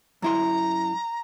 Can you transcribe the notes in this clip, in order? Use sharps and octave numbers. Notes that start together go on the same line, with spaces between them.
F#2 E4 A#5 C6